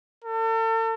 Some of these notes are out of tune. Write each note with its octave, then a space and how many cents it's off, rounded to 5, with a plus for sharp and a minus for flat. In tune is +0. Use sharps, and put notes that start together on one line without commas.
A4 +40